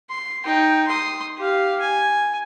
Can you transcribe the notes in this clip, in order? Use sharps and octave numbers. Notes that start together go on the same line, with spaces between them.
C6
D#4 G5
C6 D#6
G4 F5
G#5